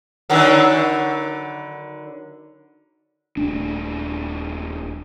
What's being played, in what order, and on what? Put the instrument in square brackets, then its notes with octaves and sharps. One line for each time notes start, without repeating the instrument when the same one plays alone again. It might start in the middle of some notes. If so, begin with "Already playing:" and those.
[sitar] D3 D#3 F#3
[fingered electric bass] D#1 A3 D4